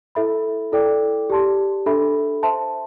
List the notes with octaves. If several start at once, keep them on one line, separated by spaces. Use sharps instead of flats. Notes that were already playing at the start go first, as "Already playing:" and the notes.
E4 A4 E5 B5
E4 A4 D5 G5 D6
G4 D5 A5 C6
D4 A4 E5 B5
C5 E5 A5 C6